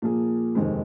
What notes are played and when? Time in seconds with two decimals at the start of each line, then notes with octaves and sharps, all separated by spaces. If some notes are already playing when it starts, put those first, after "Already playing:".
0.02 A#2 F3 A#3 G#4
0.55 F1 D#2 D#3 G#3 C4